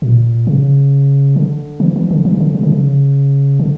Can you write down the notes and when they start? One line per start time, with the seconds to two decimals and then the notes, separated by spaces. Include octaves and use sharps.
0.02 A#2
0.47 C#3
1.36 D3
1.80 E3
1.96 E3
2.11 D3
2.25 E3
2.34 C#3
2.40 D3
2.55 C#3
2.63 D3
2.72 C#3
3.59 D3